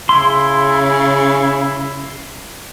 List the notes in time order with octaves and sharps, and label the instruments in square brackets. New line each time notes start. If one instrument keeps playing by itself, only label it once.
[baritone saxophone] C#3 [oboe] E4 [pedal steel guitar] C6